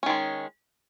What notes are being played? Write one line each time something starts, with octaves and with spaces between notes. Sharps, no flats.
D#3 G#3 C#4